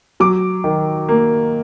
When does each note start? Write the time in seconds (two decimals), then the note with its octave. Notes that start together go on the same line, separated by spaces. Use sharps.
0.20 F#3 D6
0.64 D#3
1.09 A#3